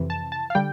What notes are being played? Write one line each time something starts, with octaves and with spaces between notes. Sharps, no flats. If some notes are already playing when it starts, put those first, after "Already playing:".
Already playing: F2 C3 E3
A5
A5
F5
D3 G3 G5